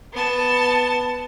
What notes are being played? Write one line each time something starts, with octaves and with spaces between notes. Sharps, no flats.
B3 A5